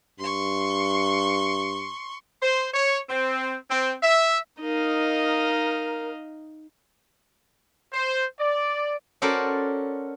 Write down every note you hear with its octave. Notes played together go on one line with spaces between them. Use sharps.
G2 C6 C#6
C5
C#5
C4
C4
E5
D#4 A#4 D#5 F5
C5
D5
C#4 F#4 A4 A#4 C5 D5